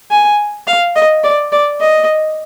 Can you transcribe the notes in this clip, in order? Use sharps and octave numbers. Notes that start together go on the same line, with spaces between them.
G#5
F5
D#5
D5
D5
D#5